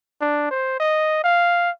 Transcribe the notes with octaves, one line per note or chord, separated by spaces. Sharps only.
D4
C5
D#5
F5